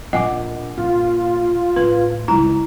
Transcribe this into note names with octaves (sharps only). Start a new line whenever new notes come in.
A#1 D#5 F#5 G#5 D6
A#2 F4
A2 B4 C6
C#2 G#3 E4 A#5